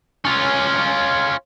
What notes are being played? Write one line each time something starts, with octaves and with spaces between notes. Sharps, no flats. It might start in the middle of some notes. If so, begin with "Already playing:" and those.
C#4 F4